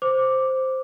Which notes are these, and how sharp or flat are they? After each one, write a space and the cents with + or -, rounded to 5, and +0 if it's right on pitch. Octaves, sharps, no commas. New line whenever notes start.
C5 +0 D6 +0